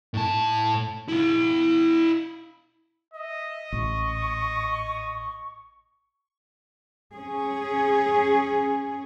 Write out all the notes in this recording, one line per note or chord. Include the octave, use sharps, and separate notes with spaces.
A2 A5
E4 F5
D#5 E5
A1 C#6
C#4 G#4